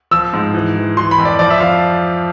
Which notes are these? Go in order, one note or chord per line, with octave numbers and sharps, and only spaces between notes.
F3 E6
G#2
E3
E3
E3 C6
B5
F2
D5
F3 D5
E5
F3 F5